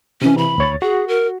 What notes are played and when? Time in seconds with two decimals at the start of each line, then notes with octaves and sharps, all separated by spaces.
0.22 C3 E3 C#4
0.38 B5
0.58 D2 C#5 A6
0.82 F#4 G#4
1.08 A#4